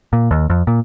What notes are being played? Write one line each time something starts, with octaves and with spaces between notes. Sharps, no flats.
A#2
D#2
F2
A#2